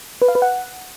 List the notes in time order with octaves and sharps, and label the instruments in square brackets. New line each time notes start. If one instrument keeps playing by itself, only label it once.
[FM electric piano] B4
F5
B4
F#5